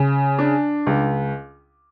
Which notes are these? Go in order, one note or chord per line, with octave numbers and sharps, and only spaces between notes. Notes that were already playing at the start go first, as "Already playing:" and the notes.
Already playing: C#3
D4
C#2